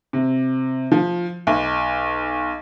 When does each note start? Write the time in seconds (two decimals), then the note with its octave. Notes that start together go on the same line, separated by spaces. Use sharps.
0.13 C3
0.92 F3
1.47 B1